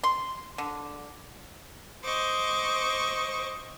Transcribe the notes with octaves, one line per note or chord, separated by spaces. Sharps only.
C6
D3
C5 D#5 C#6 D6